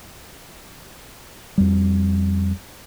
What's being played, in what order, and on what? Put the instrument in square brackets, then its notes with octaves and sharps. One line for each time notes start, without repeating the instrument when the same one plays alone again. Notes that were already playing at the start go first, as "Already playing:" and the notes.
[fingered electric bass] F2 G3